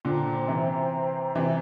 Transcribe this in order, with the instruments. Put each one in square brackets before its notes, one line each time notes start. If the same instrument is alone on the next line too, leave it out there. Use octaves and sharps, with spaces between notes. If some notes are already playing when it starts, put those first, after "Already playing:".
[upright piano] A#2 D3 [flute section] C5 G5 A#5
[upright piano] C3 E3
C3 E3